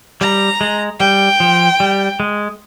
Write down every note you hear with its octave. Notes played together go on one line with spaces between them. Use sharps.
G3 A#5
G#3
G3 G5
F3
G3
G#3